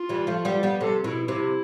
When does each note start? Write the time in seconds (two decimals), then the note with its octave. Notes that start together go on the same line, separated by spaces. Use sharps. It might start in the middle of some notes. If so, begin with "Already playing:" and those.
Already playing: F4
0.09 E3 G3
0.27 F3 A3
0.45 G3 B3
0.63 G3 B3
0.81 C3 A4
1.04 B2 E4
1.28 C3 E4